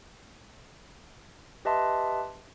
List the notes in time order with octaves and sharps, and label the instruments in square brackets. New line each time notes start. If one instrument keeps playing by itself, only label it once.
[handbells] G4 B4 D#5 E5 A5 C6